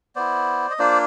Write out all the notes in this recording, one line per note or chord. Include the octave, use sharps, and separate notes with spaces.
B3 E4 C5 D5
D#5
A#3 D4 F4 C5 D5